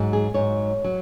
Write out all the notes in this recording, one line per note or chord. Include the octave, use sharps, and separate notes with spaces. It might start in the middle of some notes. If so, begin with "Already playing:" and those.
Already playing: G#2 F#3
G#4
G#2 F#3 C#5
F#3